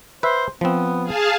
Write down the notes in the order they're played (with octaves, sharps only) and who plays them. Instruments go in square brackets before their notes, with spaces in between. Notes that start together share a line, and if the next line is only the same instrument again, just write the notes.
[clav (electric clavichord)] B4 E5 [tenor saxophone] C5
[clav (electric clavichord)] F3 C4 [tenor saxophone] B3
[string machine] G#4 F5 A5